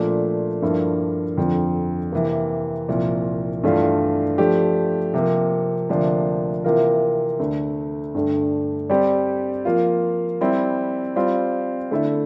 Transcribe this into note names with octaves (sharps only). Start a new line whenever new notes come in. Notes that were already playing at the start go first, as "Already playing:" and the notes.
Already playing: A#2 F3 A3 D4
G2 F3 A#3 E4 A4
F2 D3 F3
C3 E3 A#3
C2 A#2 F3
G2 E3 A3 D4 F4
F3 A3 D4 G4
C3 F3 A#3
D2 C3 F3 A#3 D4
C3 E3 A#3 F4 A#4
D2 D3 A3
G2 D3 A3
G3 C4 G4 D5
F3 A#3 F4
G3 C4 E4
G3 C4 F4 C5
D3 A3 E4 A4 E5